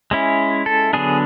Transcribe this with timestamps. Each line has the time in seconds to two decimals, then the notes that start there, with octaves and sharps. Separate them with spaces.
0.11 G#3 C#4 E4
0.66 A4
0.93 D3 F#3 B3 D4 G#4